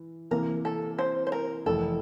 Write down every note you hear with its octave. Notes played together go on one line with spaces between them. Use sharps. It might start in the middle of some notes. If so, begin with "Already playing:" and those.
Already playing: E3
C3 E3 A#3 A#4
A4
C5
C5
A#4
F1 F2 E3 A4